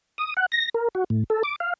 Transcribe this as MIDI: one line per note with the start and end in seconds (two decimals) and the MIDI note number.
0.18 0.34 87
0.37 0.46 78
0.52 0.69 94
0.74 0.88 70
0.95 1.04 66
1.10 1.24 45
1.30 1.43 69
1.43 1.56 86
1.60 1.73 77